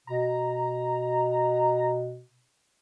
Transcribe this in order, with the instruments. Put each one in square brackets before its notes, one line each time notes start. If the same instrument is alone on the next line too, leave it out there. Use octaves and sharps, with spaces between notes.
[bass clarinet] B2 [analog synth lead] A#5